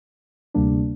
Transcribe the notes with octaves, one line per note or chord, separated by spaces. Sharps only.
D2 C3 G3 A#3 D4